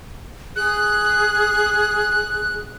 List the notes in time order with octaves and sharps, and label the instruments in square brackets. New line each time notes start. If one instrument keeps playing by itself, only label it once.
[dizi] G#4 [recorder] F#6